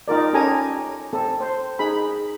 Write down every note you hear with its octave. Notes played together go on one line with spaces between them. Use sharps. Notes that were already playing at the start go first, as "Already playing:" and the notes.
D#4 F4 A#4 D5
C#4 G4 A4 G#5 A#5
C4 A4
C5
D#4 G#4 B5